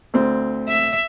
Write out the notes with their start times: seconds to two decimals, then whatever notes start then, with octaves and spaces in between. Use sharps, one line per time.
0.14 D2 C4
0.68 E5